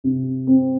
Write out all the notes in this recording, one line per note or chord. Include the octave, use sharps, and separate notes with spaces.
C3
C4